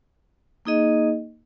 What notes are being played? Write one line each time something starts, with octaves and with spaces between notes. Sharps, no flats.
A#3 D#4 G#4 D#5